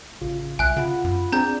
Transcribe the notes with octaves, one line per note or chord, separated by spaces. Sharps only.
A1 C#3 F4
C2 E5 G#5 F#6
C#3 F4 F#5 B5
F#2
C4 D4 G#4 D5 A#5 G6